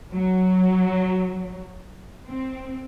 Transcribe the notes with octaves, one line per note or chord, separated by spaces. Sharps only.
F#3
C4